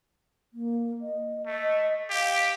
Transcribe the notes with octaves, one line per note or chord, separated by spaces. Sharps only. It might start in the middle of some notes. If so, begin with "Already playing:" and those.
A#3
D#5
A3 D#5
G4 F5